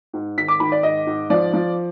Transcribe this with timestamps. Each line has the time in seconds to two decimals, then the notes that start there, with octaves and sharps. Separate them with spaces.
0.13 G#2
0.38 D#3 B6
0.48 D6
0.60 D#3 B5
0.72 D5
0.83 G#2 D#5
1.07 G#2
1.30 F3 D5
1.54 F3